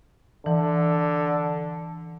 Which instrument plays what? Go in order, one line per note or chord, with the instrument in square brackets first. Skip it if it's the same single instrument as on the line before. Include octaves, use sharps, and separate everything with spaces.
[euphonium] D3 [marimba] E3